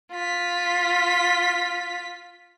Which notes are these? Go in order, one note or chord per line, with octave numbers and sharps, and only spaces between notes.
F4 B6